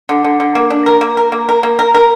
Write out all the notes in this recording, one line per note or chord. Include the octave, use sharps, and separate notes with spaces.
D3
D3
D3
A#3
D4
A#4
A#3
A#4
A#3
A#4
A#3
A#4
A#4